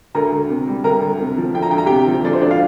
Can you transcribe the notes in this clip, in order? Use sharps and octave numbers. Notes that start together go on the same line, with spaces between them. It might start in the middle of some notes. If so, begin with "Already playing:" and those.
D2 A#4 A#5
D2
C3
G3
D2 A#4 A#5
D2
C3
F3
D2 G5
A#5
D2 G5
A#5
C3 G4 G5
F3
D2 D4 D5
C5
D2 D4 D5
F4 F5